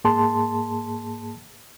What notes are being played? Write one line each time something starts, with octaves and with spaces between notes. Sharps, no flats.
G#2 A#3 G#4 A5 C6